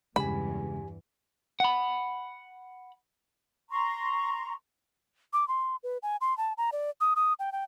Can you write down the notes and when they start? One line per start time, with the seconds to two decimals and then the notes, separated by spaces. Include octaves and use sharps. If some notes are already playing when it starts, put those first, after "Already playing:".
0.16 E2 G2 C#3 E3 G#3 G4 G#5 B5
1.60 F#5 B5
3.70 A#5 C6 C#6
5.33 D6
5.48 C6
5.83 B4
6.03 G#5
6.21 C6
6.38 A5
6.58 A#5
6.72 D5
7.01 D#6
7.16 D#6
7.39 G5
7.52 G5